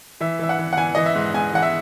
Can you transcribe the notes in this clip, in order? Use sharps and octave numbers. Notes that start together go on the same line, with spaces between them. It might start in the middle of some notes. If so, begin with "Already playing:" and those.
E3 E5
E3 E5
F#5
E3
F#5
E3 G#5
E3 D#5
E5
G#2
G#2 G#5
E3 F#5
E5